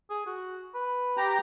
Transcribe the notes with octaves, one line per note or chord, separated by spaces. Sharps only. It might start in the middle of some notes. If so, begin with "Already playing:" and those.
G#4
F#4
B4
G4 A#5